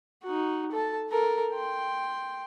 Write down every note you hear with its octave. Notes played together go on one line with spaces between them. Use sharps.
D#4 F#4
A4 A5
A4 A#4
G5 C6